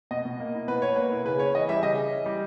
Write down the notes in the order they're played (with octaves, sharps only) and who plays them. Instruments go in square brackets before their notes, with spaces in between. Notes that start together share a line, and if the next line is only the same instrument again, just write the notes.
[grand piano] B2 D#5
B2
A#3
E4
B2 B4
B2 C#5
A#3 B4
E4
C#3 B4
C#4 C#5
E3 D#5
G3 E5
C#3 D#5
C#4
E3
G3